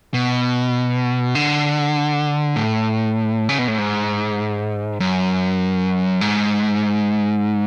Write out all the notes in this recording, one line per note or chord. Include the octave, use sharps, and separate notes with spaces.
B2
D3
A2
C#3
B2
A2
G#2
F#2
G#2